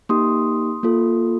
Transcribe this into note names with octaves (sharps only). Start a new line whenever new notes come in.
A#3 D#4 G4 C6 D#6
A#3 F4 A4